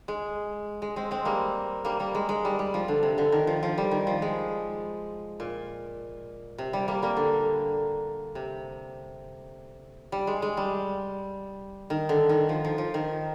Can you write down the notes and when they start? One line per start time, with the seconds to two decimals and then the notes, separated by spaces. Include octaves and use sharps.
0.08 G#3
0.82 G#3
0.96 G#3 C4
1.11 G#3 C4
1.25 G3 A#3
1.85 G3 A#3
1.99 G3 A#3
2.15 G#3
2.29 G#3
2.45 G3
2.59 G3
2.74 F3
2.88 D3
3.03 C3
3.18 D3
3.32 D#3
3.47 F3
3.63 F3
3.78 G3
3.91 D#3
4.07 F3
4.22 G#3
5.40 A#2
6.58 C3
6.73 G3
6.88 G3 A#3
7.02 G3 A#3
7.17 D3
8.35 C3
10.12 G3
10.27 G#3
10.42 G#3
10.57 G3
11.90 D#3
12.09 D3
12.29 D#3
12.49 F3
12.65 F3
12.78 F3
12.94 D#3